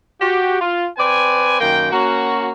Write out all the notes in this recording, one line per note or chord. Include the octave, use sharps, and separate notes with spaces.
F#4 G4
F4
C4 B4 D5 G#5
F#2 D#3 A#3 G5
A#3 C#4 F#4